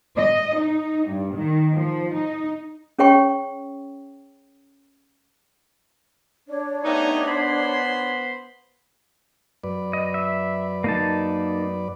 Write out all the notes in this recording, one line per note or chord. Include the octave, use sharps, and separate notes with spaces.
D#5
D#4
G2
D#3
F3
D#4
C#4 G#4 C#5 G5 C#6
D4 C#5
C3 A3 B3 D#4
B3 C5 B5 C6
F#2 B4 D5
D#5
E5
A#3 D#4 A5